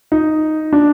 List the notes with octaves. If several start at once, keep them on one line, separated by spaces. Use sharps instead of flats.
D#4
D4